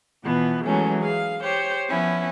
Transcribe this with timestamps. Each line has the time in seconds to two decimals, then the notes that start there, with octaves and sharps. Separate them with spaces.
0.23 B2 E3 F3 B3
0.64 E3 F#3 G#3 A3 C#4
1.00 G#4 F5
1.43 G4 C5 C#5
1.88 F3 B3 C#4 E4